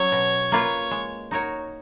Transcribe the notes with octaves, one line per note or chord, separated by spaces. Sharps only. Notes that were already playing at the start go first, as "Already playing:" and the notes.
Already playing: F#3 C#4 C#5
B2
A#3 F4 B4
G#3
D#4 F#4 A#4 C#5